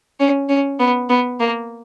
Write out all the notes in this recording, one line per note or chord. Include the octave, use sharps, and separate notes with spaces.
C#4
C#4
B3
B3
A#3